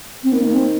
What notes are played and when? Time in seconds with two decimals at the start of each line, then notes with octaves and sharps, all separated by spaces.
0.23 C4
0.32 D#3 A#3
0.44 A#3
0.52 C4